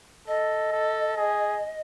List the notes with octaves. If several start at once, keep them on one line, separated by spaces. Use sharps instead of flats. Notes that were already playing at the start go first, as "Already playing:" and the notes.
A4 D#5
A4
G#4